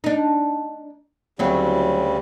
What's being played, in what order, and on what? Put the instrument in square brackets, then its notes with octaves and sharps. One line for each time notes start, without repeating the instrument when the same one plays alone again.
[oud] D4 D#4
[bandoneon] D2 C#3 G3 [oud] F#3 C4 E4